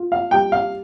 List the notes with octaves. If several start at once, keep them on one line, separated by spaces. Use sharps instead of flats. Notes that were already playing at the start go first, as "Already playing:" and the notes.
Already playing: F4
F5
G3 G5
F5